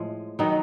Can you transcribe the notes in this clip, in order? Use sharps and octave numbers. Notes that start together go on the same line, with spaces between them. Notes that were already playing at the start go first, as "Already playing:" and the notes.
Already playing: A2 F3 G#3
D#3 F#3 B3 D#4